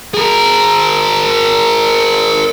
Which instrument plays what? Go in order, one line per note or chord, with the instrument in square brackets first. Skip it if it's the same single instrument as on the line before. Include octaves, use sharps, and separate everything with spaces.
[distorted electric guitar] G#4 A#4